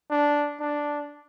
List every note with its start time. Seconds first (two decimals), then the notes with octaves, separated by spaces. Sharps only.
0.10 D4
0.60 D4